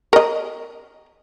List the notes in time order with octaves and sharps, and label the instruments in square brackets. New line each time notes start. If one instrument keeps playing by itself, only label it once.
[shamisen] A#4 D#5